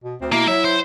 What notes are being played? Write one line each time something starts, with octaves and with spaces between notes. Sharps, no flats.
B2
D2 C4
B2 A#3 E4
F#3 E4 E5
C5